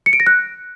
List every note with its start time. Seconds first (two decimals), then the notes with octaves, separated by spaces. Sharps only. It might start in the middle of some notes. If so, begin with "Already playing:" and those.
0.06 C#7
0.13 D7
0.20 A#6
0.27 F#6